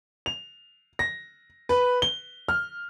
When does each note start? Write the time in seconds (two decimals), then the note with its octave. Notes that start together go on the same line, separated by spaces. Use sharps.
0.26 F7
0.99 A#6
1.69 B4
2.02 G7
2.48 F6